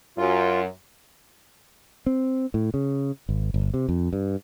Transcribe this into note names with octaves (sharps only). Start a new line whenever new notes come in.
F#2 F4
C4
A2
C#3
G#1
G1
C3
F2
G2